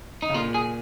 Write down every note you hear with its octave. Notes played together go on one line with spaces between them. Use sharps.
D#4
C#3
A#2 F4
G#4